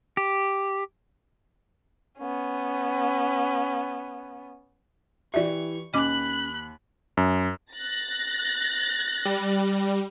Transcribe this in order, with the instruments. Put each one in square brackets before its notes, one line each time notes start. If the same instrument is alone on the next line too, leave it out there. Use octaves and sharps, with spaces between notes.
[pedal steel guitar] G4
[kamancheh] B3 C#4
[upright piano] E3 G4 [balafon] D5 E5 [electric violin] C#6
[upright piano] D#2 [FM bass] C#4 [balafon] D#5 D6 [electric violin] B5 F#6
[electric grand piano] F#2
[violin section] F#6 A6 A#6
[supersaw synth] G3